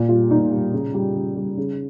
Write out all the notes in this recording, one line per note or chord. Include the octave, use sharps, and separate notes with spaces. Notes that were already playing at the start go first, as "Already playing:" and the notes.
Already playing: A#2
G3 F4
A#2 D#4
G3
C#3
G3
C#3
G3
C#3